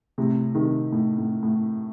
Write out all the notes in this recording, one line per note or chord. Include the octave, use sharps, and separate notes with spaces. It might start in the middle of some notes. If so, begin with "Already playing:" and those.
A2 C3
C3 D#3
A2
A2
A2